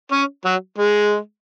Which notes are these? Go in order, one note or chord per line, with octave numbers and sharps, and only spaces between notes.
C#4
F#3
G#3